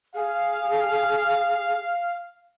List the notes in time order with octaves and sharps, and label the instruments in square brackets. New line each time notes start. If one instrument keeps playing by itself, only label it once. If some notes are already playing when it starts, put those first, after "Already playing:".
[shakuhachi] G#4 [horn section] F5